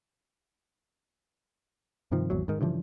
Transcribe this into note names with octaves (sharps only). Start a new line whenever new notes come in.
G2 C3 D#3 F3
G#1 E2 F#3
G#2 D#3
G2 C#3 E3 F3